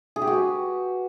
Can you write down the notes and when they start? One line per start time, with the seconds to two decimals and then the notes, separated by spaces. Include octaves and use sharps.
0.16 G#4
0.22 G4
0.27 F#4
0.33 B4